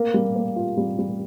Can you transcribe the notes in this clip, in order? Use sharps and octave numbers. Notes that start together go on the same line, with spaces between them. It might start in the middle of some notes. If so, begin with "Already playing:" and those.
Already playing: A#3
G3
A#3
F4
G3
G3